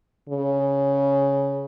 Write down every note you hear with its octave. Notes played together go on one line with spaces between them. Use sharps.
C#3